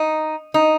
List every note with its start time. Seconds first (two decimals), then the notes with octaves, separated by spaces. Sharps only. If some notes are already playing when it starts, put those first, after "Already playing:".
Already playing: D#4
0.54 D#4